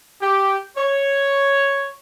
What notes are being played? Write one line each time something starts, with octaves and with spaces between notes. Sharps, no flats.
G4
C#5